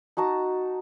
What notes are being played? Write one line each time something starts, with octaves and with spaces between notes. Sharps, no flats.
D#4 F#4 A5 A#5